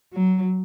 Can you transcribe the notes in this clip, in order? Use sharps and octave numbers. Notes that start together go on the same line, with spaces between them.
F#3